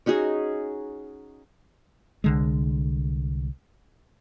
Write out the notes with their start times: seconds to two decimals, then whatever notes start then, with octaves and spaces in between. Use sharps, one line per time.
0.06 C#4 D#4 F#4 G#4
2.24 C2 D3 G#3